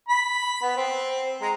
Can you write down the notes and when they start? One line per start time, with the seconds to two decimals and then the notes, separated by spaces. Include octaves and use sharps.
0.09 B5
0.62 B3
0.77 C4
1.42 G#3 A#5